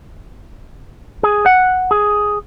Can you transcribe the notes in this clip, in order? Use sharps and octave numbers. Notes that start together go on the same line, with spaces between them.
G#4
F#5
G#4